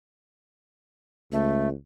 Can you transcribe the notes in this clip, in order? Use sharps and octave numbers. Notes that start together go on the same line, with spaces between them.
C#2 A3